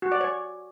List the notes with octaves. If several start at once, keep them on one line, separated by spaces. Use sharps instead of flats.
F#4
D5
C#5